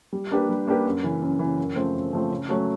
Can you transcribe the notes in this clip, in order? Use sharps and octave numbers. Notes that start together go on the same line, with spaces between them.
G3
A#3 D4 G4 B4
G3
A#3 D4 G4 B4
F#2
C#3 E3
F#2
C#3 E3
F#2
C#3 F3 A3 C4
F#2
C#3 F3 A3 C4
C#3
F#3 A3 C#4